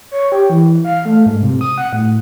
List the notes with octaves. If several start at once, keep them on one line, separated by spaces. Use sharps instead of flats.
C#5
G4
E3
F5
A3
G#2
C3
D#6
F#5
A2